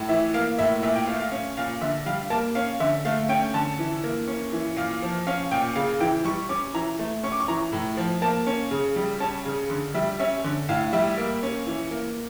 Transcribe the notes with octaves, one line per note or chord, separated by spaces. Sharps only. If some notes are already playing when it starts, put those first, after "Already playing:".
Already playing: A2
E3 E5
A#3 F5
A2 E5
A#2 E5
G5
A3 F5
F5
C#4
A#2 F5
D3 E5
G3 F5
A#3 A5
C#4 F5
D3 E5
A3 F5
C#4 G5
D3 A5
E3
A#3
C#4
E3
A#2 F5
F3
C#4 F5
A#2 G5
C#3 F5
E3 G5
G3 C#6
C#4 D6
E3 A#5
A3
C#4 C#6
D6
C#6
E3 A#5
A2
F3
A#3 A5
C#4
C#3
G3
C#4 A5
C#3
D3
G3 E5
C#4 E5
D3
A2 F5
G3 E5
A#3
C#4
E3
A#3